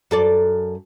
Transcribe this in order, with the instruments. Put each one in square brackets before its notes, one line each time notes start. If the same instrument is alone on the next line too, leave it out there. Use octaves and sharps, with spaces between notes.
[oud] F#2 A4 D5